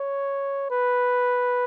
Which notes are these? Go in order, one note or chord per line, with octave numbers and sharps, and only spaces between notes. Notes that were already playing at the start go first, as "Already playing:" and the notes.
Already playing: C#5
B4